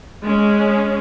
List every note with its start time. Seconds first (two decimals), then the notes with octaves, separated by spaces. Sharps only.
0.24 G#3 C#4